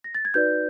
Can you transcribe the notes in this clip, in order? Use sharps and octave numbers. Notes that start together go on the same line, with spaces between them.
A#6
A6
G#6
D#4 F#4 B4 D5 G6